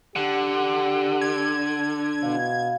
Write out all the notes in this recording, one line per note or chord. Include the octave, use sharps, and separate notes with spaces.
D3 G4 F#5
G#6
B2 F5